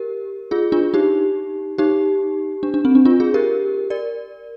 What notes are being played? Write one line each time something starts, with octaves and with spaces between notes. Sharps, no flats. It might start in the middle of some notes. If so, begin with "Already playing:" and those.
Already playing: G4 A#4
F4 G#4
D4 F4
D#4 G4
D#4 G4
D4
D4
C4
D4
D4 F4
F4 G#4
G4 A#4
A#4 D5